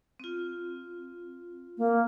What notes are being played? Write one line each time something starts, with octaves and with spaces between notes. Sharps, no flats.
C4 F4
A#3